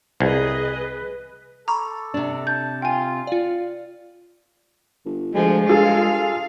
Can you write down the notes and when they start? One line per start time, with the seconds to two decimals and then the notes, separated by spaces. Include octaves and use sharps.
0.20 C2 G#4 B4 D#5
1.68 A4 A#5 B5 C#6 D6
2.14 C3 D4
2.47 A5 G6
2.82 F4 G5 G#5
3.27 F4 D5 F5
5.05 G1
5.35 D2 F3 G#3
5.69 G2 F4 G#4 A4 F5